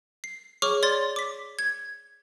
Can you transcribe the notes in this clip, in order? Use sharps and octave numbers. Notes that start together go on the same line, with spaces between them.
C7
G#4 C#5 C#6 D6 F6
C#5 D5 C6 A6
D6 B6
G#6